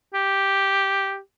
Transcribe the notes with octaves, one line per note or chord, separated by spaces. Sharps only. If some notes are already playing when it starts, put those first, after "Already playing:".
G4